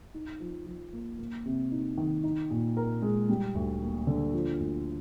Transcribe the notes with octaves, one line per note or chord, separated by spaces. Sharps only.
D#4
F3
F3
A#3
A#3
C3
D#4
D#3
D#4
A#2
A#4
G#3
G3
D2
A#3
D3
F3
D2